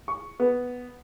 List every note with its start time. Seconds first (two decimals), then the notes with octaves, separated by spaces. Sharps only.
0.08 C#6
0.40 B3